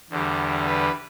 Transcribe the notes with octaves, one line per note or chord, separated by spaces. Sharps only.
E2 D3 G3
B4